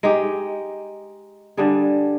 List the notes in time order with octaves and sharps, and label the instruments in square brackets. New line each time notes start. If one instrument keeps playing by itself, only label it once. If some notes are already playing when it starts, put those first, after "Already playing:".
[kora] G#3 D#4 G4
D3 G3 D4 G#4